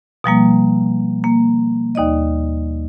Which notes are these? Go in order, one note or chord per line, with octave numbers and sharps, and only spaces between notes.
B2 F3 G3 A#3
A#3
D#2 D#4 D5 D#5